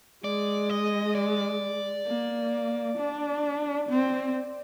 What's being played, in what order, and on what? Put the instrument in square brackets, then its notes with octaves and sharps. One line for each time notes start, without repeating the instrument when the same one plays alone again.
[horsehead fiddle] G#3 [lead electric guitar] D5
[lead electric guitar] D#5
D5
[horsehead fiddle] A#3
D4
C4